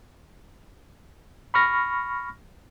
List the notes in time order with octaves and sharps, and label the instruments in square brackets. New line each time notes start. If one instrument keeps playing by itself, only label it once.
[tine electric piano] B5 C#6 F6 A#6